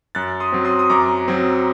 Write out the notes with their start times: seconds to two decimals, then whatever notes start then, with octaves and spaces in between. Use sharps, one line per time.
0.15 F#2 F#6 A6
0.40 C6 D#6
0.52 F#3 C4
0.65 C6 D#6
0.79 D#6
0.90 F#2 A#5 D6
1.28 F#3 C4